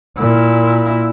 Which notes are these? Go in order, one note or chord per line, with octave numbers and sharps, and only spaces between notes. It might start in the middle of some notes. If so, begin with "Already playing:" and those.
A#2 E4